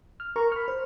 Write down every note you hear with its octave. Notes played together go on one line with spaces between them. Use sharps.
F6
A#4 A#5 C#6
B5 F6
C5